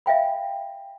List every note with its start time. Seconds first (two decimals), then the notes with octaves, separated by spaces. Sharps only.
0.06 E5 F5 G5 B5